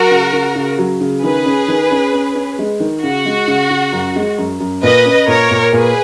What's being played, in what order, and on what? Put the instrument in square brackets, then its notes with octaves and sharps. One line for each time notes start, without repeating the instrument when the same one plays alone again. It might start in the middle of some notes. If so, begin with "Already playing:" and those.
Already playing: [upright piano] F#3 [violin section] F#4 A#4
[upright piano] C#3
C#3
C#3
F#3
C#3
[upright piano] D#3 [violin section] G#4 B4
[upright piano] C#4
D#3
C#4
C#4
C#4
G#3
D#3
[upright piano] C#3 [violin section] F#4
[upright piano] G#3
C#3
C#3
F#2
G#3
F#2
F#2
[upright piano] A#2 [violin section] B4 D#5
[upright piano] C#4
[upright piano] A#2 [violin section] A#4 C#5
[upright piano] A#2
[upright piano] A#2 [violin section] G#4 B4